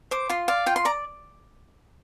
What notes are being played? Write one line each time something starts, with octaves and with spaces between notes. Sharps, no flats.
C5 D6
F4 C6
D5 F5
F4 G5
C6
D5 A#5